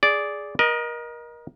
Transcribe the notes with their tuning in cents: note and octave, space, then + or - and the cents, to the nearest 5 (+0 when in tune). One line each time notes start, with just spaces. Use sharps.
G#4 +0 D5 -10
A#4 +30 D#5 -5